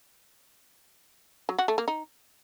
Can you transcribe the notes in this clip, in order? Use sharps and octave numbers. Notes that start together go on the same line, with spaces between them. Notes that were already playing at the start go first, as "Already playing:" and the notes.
F#3
F#4
A3
A#3
D#4